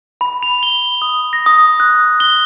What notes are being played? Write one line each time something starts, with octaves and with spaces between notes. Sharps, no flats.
B5
F7
G7
D#6
A#6
D#6
F#6
G7